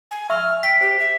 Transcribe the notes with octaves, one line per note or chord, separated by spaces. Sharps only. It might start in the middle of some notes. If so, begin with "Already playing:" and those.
G#5
E5 C#6 E6 F6
G5 B6
G4 C5
E5